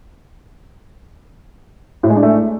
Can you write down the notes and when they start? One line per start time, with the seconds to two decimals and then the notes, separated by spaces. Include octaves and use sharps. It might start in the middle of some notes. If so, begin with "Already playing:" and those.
2.03 A2
2.10 G#3
2.16 D4
2.23 A3